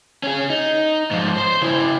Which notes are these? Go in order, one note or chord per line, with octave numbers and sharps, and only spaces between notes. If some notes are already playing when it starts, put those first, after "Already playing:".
C#4 G#4
D#4
G#2 F3
C5 C6
C#3 E4